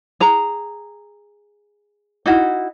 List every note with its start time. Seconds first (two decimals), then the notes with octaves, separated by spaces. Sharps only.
0.20 G#4 A#5
2.26 D#4 E4 F#4